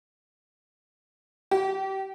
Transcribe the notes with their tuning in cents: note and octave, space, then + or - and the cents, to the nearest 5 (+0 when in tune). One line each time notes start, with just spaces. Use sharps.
G4 -30